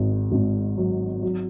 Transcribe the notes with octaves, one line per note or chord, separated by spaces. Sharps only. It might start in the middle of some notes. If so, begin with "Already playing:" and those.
Already playing: G#1 G#2
G#1
F#3
F#3